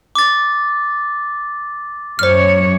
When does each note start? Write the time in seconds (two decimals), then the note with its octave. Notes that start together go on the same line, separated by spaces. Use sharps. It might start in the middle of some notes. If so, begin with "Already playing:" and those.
0.15 D6 A6
2.19 F#2 C5 C#5 F6